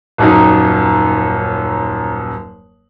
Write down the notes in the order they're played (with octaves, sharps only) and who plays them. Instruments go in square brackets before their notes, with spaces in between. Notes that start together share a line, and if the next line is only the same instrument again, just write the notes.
[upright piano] D#1 F#2 D#4